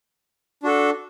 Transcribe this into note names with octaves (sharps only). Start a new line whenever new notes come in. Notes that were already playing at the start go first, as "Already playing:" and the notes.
D4 F#4 A4